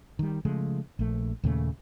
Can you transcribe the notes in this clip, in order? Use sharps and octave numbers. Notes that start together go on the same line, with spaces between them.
D#3 G3
C#3 F3 G#3 A3
A#1 A3
D#2 A#2 C#3 A3